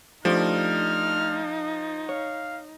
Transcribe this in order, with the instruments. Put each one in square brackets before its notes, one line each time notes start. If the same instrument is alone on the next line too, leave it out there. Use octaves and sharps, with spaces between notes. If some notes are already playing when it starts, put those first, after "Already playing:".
[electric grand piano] F3 [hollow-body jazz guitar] A3 D4 G4 [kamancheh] D#4 [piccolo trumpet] F6
[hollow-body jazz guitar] C#5 [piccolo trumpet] F5